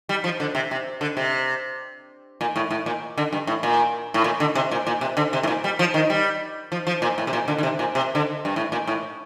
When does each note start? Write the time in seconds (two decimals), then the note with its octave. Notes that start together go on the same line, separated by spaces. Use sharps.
0.09 G3
0.24 F3
0.40 D3
0.55 C3
0.71 C3
1.01 D3
1.17 C3
2.41 A#2
2.56 A2
2.70 A2
2.86 A#2
3.18 D3
3.33 G2
3.47 A2
3.63 A#2
4.14 A2
4.24 A#2
4.40 D3
4.55 C3
4.71 A#2
4.87 A#2
5.01 C3
5.17 D3
5.33 C3
5.43 A2
5.48 A#2
5.64 G3
5.79 F3
5.94 D#3
6.10 G3
6.72 F3
6.87 F3
7.02 A#2
7.18 A2
7.27 C3
7.33 A#2
7.48 D3
7.58 D3
7.63 C3
7.79 A#2
7.95 C3
8.15 D3
8.45 G2
8.56 A2
8.72 A#2
8.87 A2